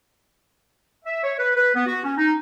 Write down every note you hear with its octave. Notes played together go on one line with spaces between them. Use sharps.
E5
C#5
B4
B4
B3
F#4
C#4
D#4